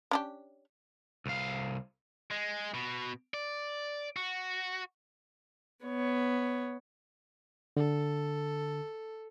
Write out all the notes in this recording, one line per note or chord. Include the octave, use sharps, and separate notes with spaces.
C#4 D4 G4
C2 F5
G#3
B2
D5
F#4
B3 C#5
D3 A4